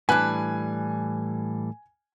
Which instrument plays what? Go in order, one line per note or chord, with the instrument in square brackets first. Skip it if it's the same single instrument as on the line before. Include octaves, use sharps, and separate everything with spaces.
[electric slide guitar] A2 E3 G3 [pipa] D4 B4 [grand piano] G#5 F#6